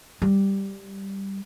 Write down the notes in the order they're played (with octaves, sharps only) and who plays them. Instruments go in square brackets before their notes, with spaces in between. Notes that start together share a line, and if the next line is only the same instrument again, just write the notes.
[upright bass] G3